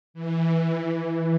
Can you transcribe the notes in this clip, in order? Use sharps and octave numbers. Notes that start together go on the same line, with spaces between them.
E3